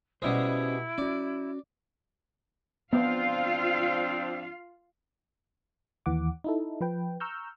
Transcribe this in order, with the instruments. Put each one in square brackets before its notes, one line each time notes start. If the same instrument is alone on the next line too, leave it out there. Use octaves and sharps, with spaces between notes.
[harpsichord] B2 G3 G#3 [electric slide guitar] C#4 C5 [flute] E4
[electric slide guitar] C#4 F#4 [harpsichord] D5
[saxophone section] F3 C4 D4 [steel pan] B3 [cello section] F4 F5
[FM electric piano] D#2 E3 F#5 D6
D#4 E4 A4
F3 B4 G5
A#5 C#6 E6 F6 G6